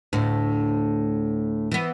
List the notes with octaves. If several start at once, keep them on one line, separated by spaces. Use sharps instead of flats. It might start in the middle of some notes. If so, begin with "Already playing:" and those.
D2 A2
E3 B3